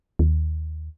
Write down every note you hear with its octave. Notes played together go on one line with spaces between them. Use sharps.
D#2